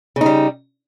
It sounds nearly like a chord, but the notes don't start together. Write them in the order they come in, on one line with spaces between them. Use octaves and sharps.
C#3 D#4 G3